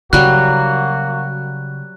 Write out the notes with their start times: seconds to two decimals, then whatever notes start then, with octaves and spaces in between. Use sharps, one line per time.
0.13 C#3 F#3 G3 A#3 F#4 F#6